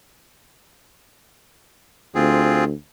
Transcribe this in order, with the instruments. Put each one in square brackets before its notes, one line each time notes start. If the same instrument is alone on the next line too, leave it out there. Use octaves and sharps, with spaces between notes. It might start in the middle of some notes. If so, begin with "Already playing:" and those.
[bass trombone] D2 [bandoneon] C4 F4 G#4